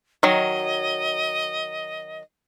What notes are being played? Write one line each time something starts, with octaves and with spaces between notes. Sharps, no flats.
D#3 F#3 D#5